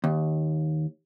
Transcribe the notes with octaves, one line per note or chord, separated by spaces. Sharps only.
D#2